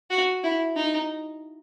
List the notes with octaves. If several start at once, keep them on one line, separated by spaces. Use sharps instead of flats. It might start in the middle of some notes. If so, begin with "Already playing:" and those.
F#4
E4
D#4